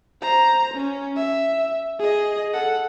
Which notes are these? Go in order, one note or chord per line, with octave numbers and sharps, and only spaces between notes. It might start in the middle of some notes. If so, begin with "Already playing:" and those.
C5 A#5
C#4
E5
G#4 D#5
A4 F#5